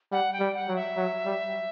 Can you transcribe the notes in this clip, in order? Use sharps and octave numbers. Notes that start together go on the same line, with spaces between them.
G3 F#5
G5
G3
F#5
F#3
E5
F#3
G3